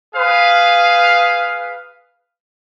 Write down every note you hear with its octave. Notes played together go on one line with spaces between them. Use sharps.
G#4 B4 F5